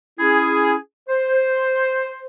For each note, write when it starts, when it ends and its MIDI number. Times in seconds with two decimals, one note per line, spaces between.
0.19 0.75 61
0.19 0.75 64
0.19 0.75 68
1.09 2.27 72